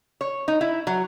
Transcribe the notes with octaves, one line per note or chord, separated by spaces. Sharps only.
C#5
D#4
E4
F#3